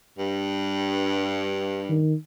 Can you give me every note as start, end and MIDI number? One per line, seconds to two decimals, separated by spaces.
0.19 2.02 43
1.90 2.14 51